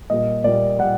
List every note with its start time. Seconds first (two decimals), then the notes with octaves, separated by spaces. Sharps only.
0.10 A#2 G3 A#3 D#5
0.44 A#2 G3 A#3 D5
0.79 A#2 G3 A#3 F#5